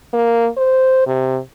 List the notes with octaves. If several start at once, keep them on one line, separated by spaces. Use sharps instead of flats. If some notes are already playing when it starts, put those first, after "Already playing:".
A#3
C5
C3